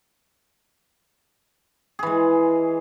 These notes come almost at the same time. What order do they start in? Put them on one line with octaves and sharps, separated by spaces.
G#4 E3 G#3